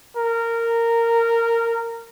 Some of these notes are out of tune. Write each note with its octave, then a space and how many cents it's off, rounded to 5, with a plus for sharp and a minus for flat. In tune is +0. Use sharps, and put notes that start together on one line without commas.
A#4 -15